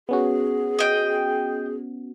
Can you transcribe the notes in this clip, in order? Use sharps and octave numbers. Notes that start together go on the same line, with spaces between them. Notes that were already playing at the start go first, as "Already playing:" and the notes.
B3 C#4 F#4 G#4
D#5 G5